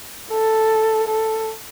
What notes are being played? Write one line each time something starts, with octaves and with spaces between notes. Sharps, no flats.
A4
A4